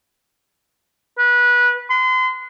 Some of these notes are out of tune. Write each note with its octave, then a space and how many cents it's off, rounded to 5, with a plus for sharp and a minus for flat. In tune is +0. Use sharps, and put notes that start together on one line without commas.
B4 -20
C6 -35